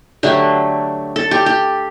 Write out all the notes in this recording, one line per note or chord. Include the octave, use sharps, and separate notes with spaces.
D3 F#3 A3 G4
A4
G4
G4